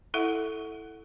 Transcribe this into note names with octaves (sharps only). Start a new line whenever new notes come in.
E4 A4 E5 F#5